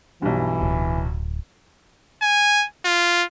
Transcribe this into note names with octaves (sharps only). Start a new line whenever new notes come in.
B1 G2 E3
D1
G#5
F4